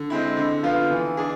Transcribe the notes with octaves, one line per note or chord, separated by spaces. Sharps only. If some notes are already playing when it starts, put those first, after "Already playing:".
Already playing: D3
G#3 C4 E4
D3
F3 B3 F4
E3
D4 G#4